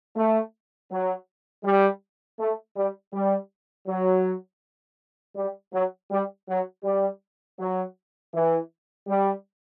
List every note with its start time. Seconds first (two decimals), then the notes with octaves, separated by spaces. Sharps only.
0.16 A3
0.90 F#3
1.64 G3
2.39 A3
2.76 G3
3.13 G3
3.87 F#3
5.36 G3
5.73 F#3
6.11 G3
6.48 F#3
6.84 G3
7.59 F#3
8.34 E3
9.08 G3